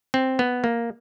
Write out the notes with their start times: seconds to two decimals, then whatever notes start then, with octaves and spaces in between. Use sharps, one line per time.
0.14 C4
0.39 B3
0.64 A#3